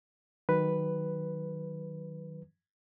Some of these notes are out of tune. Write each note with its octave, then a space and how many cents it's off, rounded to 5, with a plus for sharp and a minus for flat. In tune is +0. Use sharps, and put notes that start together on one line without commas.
D#3 +0 F#3 +0 B4 +0